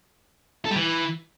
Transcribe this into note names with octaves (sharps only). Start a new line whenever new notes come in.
A4
G3
E3